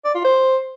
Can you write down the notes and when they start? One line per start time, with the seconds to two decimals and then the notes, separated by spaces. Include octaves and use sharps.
0.05 D5
0.15 F4
0.25 C5